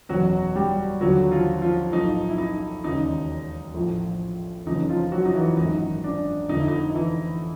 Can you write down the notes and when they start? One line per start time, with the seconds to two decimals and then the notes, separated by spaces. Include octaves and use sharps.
0.09 F#1 E2 B2 F#3 F#4
0.55 G3 G4
1.01 D#2 D3 F3 F#3 F#4
1.32 F3 F4
1.61 F3 F4
1.92 B1 A2 F3 D#4
2.29 E4
2.38 D#4
2.84 E1 D#2 C#3 D#4
3.74 A#1 A2 F3
4.66 F#1 F2 C#3 E3 D#4
4.89 F3 F4
5.12 F#3 F#4
5.25 D#4
5.35 E3 E4
5.57 G#1 F#2 D#3 D#4
6.04 D4
6.49 F1 F2 D3 D#4
6.59 E4
6.68 D#4
6.94 E3 E4